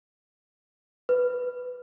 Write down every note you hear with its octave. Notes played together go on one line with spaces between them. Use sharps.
B4